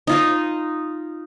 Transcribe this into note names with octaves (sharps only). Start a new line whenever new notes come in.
D#4 F4 D#5